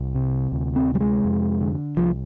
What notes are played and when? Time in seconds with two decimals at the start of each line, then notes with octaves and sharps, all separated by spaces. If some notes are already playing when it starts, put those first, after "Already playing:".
Already playing: C2
0.15 C3
0.52 D2
0.76 C4
0.89 C3
0.95 G3
1.01 G#3
1.25 F2
1.61 D3
1.97 C2 F3